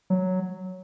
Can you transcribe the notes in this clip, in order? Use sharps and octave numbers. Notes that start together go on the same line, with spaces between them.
F#3